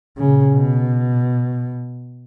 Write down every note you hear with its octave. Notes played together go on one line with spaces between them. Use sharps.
A#2 C#3
B2